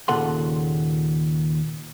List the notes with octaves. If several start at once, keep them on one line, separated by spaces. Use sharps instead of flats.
D#2 A#2 C#3 A4 F#5 C6